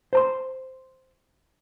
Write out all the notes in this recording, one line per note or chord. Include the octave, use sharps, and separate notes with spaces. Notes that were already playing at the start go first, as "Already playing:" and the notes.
C5 A#5 C6